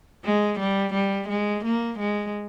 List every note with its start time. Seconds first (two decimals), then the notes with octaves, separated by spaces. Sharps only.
0.25 G#3
0.59 G3
0.93 G3
1.28 G#3
1.64 A#3
1.98 G#3